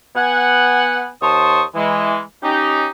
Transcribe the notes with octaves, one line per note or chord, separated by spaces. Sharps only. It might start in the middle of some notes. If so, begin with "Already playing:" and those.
B3 F#5 G#5
D#2 C5 A5 C6 C#6 D#6
E3 G#3
C#4 D#4 G4